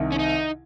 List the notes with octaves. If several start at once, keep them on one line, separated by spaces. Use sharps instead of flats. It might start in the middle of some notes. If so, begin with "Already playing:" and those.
Already playing: C2 C3 D#3
C#4
D#4